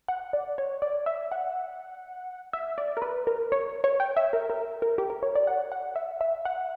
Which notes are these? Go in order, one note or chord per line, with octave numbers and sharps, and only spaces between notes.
F#5
D5
C#5
D5
E5
F#5
E5
D5
A#4
B4
A#4
C#5
C#5
G5
E5
A#4
A#4
A#4
G4
A#4
C#5
D5
F#5
F#5
E5
E5
F#5